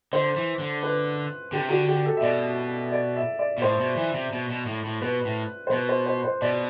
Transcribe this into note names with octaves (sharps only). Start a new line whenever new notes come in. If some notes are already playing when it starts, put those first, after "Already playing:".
D3 C5
E3
D3
B4
D3 G4
C3
D3 F#4
G4
A4
E5
B2 D5
D5
E5
D5
B2
A2 C5
B2
E3
C3
B2
B2
A2
A2
B2 B4
A2
C5
B2 B4
C5
C5
C5
B2 D5